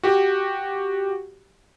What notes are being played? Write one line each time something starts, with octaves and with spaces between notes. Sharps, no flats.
F#4 G4